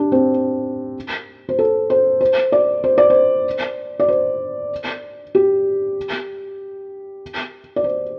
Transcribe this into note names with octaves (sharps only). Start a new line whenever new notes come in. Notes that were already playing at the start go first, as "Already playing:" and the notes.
Already playing: D4 G4
C4
C5
A4
C5
C5
D5
C5
D5
C5
D5
C5
G4
D5
C5